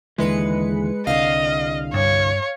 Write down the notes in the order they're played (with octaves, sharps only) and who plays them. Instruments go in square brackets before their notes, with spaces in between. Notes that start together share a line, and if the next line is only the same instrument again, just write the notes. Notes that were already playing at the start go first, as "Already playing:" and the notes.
[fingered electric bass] D#2 D3 E3 [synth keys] G#3 B4 C#7
[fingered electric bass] C2 D3 [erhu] D#5 [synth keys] F5
[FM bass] G2 [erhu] C#5